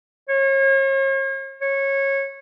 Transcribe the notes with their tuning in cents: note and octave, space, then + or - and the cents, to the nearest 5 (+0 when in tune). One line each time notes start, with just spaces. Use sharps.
C#5 -40
C#5 -20